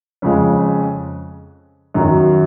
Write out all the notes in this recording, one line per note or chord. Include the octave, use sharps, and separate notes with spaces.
F2 C#3 F3 G#3
F#2 D#3 F#3